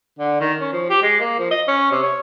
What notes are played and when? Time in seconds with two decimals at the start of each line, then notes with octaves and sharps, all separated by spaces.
0.19 D3
0.41 D#3
0.60 C#4
0.73 F3
0.90 G4
1.02 G#3
1.20 A#3
1.39 F3
1.51 D#5
1.68 C#4
1.91 C3
2.03 C#5